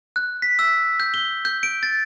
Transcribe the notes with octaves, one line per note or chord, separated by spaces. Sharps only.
F#6
B6
E6
G6
G7
G6
D7
A6